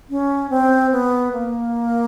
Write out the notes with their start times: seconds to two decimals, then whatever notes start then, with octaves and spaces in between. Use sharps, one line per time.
0.10 C#4
0.50 C4
0.92 B3
1.32 A#3